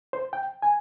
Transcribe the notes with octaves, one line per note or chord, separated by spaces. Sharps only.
C5
G5
G#5